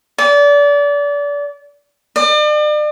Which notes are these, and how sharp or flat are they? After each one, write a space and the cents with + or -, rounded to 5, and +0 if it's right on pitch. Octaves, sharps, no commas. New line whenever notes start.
D5 -30
D5 +40